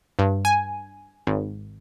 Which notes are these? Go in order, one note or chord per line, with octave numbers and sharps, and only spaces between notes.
G2
G#5
G#1